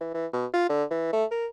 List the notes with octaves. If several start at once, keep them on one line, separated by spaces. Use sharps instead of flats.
E3
E3
B2
F4
D3
E3
A3
A#4